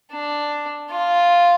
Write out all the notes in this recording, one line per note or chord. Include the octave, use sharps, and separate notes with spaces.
D4
F4